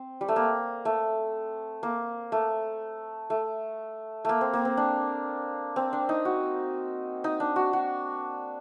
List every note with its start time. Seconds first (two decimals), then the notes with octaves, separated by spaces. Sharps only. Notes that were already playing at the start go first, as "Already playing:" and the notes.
Already playing: C4
0.21 G3
0.28 A3
0.36 A#3
0.85 A3
1.83 A#3
2.32 A3
3.30 A3
4.25 A3 A#3
4.41 C4
4.53 A#3
4.65 C4
4.77 D4
5.76 C4
5.93 D4
6.09 D#4
6.25 F#4
7.24 D#4
7.40 D4
7.56 F#4
7.73 F#4